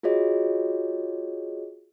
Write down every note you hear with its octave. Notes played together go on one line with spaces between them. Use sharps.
F4 F#4 G#4 C#5 D#5